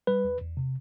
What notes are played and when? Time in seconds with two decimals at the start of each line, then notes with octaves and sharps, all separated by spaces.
0.07 G3 B4
0.24 E2
0.40 E2
0.57 C3